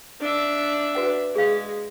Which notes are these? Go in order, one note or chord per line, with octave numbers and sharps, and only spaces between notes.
D4 E5
F#4 B4 F#5
G#3 G#4 F5